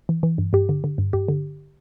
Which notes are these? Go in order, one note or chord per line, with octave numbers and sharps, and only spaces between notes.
E3
E3
G2
G2 G4
D3
D3
G2
G2 G4
D3